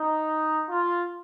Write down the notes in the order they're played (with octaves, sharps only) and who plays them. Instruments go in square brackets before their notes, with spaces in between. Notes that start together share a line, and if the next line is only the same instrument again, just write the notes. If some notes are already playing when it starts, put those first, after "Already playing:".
Already playing: [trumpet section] D#4
F4